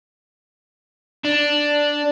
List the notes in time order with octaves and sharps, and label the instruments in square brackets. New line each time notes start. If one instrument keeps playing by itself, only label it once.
[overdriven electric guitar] D4